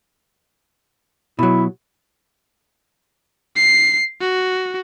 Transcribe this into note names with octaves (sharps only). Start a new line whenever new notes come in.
B2 F#3 E4
C7
F#4